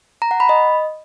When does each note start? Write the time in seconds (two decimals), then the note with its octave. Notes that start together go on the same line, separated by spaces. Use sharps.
0.22 A#5
0.31 F#5
0.40 B5
0.49 D#5